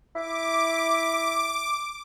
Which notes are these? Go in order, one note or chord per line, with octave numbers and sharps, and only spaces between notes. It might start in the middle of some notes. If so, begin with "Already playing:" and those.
E4 D6